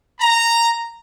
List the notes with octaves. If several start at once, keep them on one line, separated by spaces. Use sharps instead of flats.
A#5